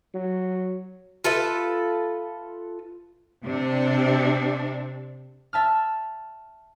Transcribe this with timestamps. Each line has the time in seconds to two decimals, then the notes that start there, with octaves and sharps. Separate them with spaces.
0.14 F#3
1.24 F4 A4 B4 E5
3.45 C3 D4
5.53 E5 A5 F6